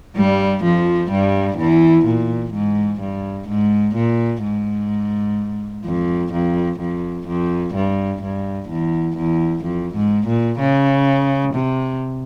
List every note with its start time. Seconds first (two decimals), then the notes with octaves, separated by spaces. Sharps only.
0.16 G2 G3
0.64 F2 F3
1.11 G2 G3
1.58 E2 E3
2.05 A#2
2.53 G#2
3.00 G2
3.49 G#2
3.95 A#2
4.43 G#2
5.85 F2
6.33 F2
6.79 F2
7.27 F2
7.74 G2
8.22 G2
8.69 E2
9.16 E2
9.64 F2
9.95 G#2
10.27 A#2
10.59 C#3
11.54 C3